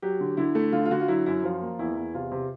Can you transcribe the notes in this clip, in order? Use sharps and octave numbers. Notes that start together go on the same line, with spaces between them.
F#3 G4
D3
D3 E4
A3
D3 F4
F4
D3 F#4
F4
F#3 E4
F#2 E4
F3 F4
A#3
E2 E4
E2
C3 F4
C3